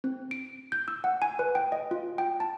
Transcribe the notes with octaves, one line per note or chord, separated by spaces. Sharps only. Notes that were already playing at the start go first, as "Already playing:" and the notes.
C4
D7
G6
E6
F#5
G#5
B4
G5
D#5
F4
G5
A5